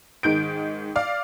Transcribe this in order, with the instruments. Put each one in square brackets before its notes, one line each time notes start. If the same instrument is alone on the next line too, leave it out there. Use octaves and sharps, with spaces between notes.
[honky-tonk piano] G#2 D#3 G6 D7
D5 F5